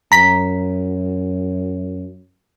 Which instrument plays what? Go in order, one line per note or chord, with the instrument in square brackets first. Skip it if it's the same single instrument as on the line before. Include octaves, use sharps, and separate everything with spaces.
[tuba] F#2 [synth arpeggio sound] A#5 B6